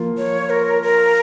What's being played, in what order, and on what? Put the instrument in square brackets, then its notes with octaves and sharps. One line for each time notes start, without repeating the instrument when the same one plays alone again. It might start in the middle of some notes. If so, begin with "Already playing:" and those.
Already playing: [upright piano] F3 A#3 F4
[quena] C#5
A#4
A#4